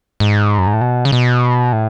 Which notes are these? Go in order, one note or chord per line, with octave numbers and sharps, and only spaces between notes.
G#2
F#2
G#2
A2
B2
C#3
B2
A2